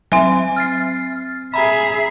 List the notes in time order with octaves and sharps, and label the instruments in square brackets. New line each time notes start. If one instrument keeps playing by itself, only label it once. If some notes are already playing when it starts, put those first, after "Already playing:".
[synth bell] F#3 E5 [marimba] C4 G#5
[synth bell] F6 A6 C7
[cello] G#4 E5 [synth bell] A#5 B5